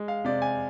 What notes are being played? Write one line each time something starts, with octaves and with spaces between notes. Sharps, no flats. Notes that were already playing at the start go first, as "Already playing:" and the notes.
Already playing: G#3
F5
C3 D5
G#5